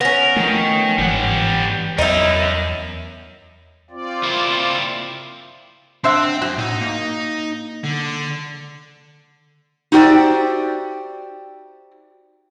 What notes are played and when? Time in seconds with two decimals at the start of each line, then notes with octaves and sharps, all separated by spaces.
0.01 B3 C#4 A#4
0.36 D#3 F3 A3
0.98 G1 G#2 E3 G3 F#5
1.99 E2 F#3 D#4 E4 A#4
3.90 C4 F4 D5
4.23 A#3 E4
6.04 C4 D4 C5 E5 F#5
6.42 F#2 F#4
6.58 A2 D#4
6.81 A#3
7.84 D3
9.92 D#4 F#4 G4 C5 D5 E5